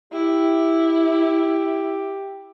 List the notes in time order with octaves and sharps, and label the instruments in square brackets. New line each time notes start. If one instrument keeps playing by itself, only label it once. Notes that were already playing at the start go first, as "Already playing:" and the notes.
[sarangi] E4 [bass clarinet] G4